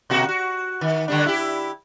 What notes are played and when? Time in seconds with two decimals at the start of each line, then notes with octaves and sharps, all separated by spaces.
0.10 B2 A#3 F#4
0.29 F#4
0.81 D#3
1.08 D3 G3 D4
1.26 E4 G4